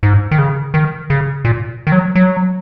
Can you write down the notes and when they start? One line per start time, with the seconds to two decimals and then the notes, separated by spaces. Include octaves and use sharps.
0.03 G#2
0.31 D#3
0.38 C#3
0.74 D#3
1.10 C#3
1.45 A#2
1.87 D#3
1.92 F#3
2.15 F#3